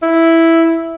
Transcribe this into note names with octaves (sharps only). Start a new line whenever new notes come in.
E4